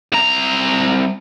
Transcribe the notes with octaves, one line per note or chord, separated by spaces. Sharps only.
C2 A#5